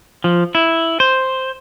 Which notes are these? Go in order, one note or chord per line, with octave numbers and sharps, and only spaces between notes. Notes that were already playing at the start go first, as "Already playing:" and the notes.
F3
E4
C5